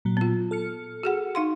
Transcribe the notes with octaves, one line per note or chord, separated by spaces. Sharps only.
A#2 F#3
B3 F4
A4 F6 C#7
F#4 G#4 F#5
D#4 F5 C6